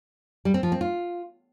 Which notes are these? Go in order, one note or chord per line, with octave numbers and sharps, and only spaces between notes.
G3
C4
F3
C4
F4